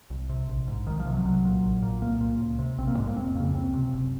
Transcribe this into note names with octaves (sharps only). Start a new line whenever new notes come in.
C2
C3
A#1
G#2
C2 D#3
F3
C3
F#3
C2 F#3
A#2
A#1
A#2
C2 A#3
A#2
C#2
C3
A#1 C4
A#3
G#2 G#3
A#3
F1 C4
F2 C#3 A#3
C#2 C4
C3
F#1